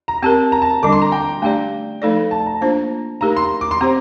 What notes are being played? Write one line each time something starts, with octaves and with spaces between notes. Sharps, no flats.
A#5
C4 G4 A#4 A5
A#5
A5
D3 G3 D4 D6
C6
A#5
G5
A3 D4 G4 D5 G5
F3 A3 D#4 A4 D5
A5
A#5
A#3 D4 F4 C5
A3 D#4 G4 A#4 A#5
C6
D6
C6
C4 G4 C5 A#5